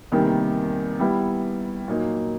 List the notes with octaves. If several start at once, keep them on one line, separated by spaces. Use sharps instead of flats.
E2 C3 D#3 G3 A#3
G3 B3 E4
A#2 F#3 A#3 D#4